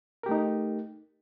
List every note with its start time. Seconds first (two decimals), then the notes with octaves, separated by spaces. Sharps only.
0.23 A#4
0.26 G4
0.29 A3
0.31 D#4